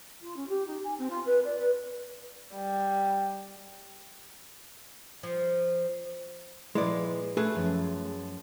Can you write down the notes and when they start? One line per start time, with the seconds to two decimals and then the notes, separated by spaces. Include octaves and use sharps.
0.21 F4
0.36 C#4
0.48 G4
0.67 D#4
0.84 G#5
0.98 C4
1.10 F4
1.26 B4
1.44 D5
1.58 B4
2.55 G3
5.23 F3
6.75 A#2 F3 G#3 E4 B4 D5
7.37 A3 G#4 B4
7.56 F#2 F3